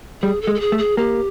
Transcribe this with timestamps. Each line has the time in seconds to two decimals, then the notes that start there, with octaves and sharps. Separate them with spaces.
0.22 G3 G#4
0.42 A4
0.47 G#3
0.55 A4
0.60 G#4
0.72 A3
0.78 G#4
0.97 A#3 G4